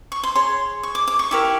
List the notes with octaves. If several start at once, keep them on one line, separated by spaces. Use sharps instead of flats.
C#6
C6
G#4 C#5 C6
C#6
D6
D6
C#6
E4 G4 A#4 C#6